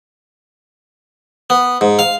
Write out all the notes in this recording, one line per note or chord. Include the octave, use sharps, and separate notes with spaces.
B3
G#2
F5